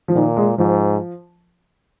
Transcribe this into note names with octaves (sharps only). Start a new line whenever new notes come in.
F3
A#2 D#3
G#3
G#2 F3